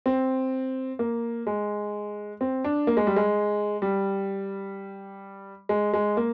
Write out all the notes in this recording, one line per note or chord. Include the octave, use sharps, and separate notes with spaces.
C4
A#3
G#3
C4
D4
A#3
G#3
G3
G#3
G3
G#3
G#3
A#3